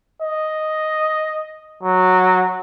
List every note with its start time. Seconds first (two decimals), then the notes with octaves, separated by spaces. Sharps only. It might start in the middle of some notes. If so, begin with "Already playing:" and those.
0.22 D#5
1.83 F#3